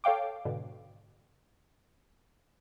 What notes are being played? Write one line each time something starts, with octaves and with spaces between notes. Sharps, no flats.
A4 C#5 F5 G5 D6
G#2 B2 D3